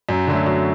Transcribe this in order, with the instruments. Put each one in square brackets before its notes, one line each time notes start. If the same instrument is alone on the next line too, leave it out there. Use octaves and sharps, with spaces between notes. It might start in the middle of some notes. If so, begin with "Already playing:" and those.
[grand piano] F#2
D3 F#3 A3
F#2